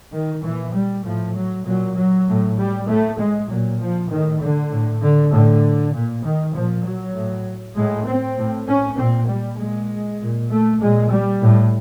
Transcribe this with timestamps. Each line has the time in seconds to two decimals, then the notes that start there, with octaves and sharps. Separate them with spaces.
0.12 D#3
0.43 A#2 E3
0.73 G3
1.05 A2 F3
1.35 F#3
1.65 A#2 F#3
1.96 F#3
2.27 A2
2.57 G3
2.87 A2 A3
3.18 G#3
3.49 A#2 F#3
3.79 F3
4.09 A2 D#3
4.40 D3
4.71 A2
5.01 D3
5.32 A2 D3
5.93 A#2
6.23 D#3
6.54 A#2 F3
6.84 F#3
7.15 A2
7.76 A2 G#3
8.06 C4
8.37 A2
8.68 C#4
8.98 A#2 C4
9.28 G3
9.59 A#2 G#3
10.20 A#2
10.51 A3
10.81 A#2 G#3
11.12 G3
11.42 A2